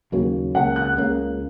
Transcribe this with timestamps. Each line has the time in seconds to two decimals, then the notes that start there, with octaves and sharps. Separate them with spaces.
0.12 D#2 C#3 F#3 A#3
0.54 C#2 C#3 A#3 F#5
0.76 F#6
0.97 C#2 C#3 A#3